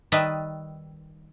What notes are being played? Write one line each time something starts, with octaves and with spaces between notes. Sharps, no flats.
D#3 G3 B4 D#5 E5 A5